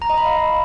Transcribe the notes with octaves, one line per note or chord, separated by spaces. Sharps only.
A#5
D#5
B5
F5